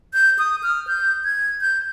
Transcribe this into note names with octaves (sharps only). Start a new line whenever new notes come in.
G6
D#6
F6
G6
G#6
G6